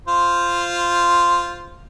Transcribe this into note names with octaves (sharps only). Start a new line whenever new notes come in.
F4 C5